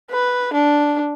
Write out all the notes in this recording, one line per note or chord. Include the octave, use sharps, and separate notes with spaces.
B4
D4